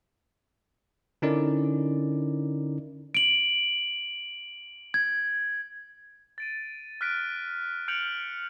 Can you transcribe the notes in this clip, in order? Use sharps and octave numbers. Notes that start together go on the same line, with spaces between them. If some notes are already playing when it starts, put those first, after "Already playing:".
D3 C#4 D#4 E4 A#4 D5
D7 F#7
G#6
A6 D7 D#7
F6 F#6 B6 D7
F6 G6 C#7 D7 F7 F#7